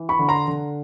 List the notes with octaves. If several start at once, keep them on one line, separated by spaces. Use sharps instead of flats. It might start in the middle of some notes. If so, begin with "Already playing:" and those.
Already playing: E3
B5 C#6
D3
A#5 C6
D3